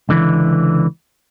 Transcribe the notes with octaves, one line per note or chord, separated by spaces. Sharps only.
C#2 D3 E3